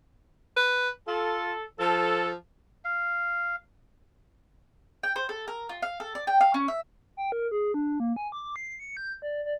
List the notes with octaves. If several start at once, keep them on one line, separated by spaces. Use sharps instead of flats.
B4
F4 A4
F3 A4
F5
G5
C5
A4
A#4
F4
F5
A4
D5
G5
F5
C#4
E5
G5
A#4
G#4
D4
A#3
G#5
D6
C7
C#7
G6
D5
D5